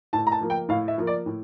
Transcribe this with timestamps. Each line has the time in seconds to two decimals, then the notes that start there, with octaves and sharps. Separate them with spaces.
0.13 A2 A5
0.27 A#5
0.32 A5
0.41 F3 A#3
0.50 G5
0.69 A2 F5
0.88 E5
0.98 F3 A#3
1.07 D5
1.26 A2